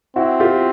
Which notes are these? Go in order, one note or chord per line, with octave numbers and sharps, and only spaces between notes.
C4 E4 F#4
F4 G4